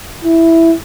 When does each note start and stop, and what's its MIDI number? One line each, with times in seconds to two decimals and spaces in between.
0.25 0.74 64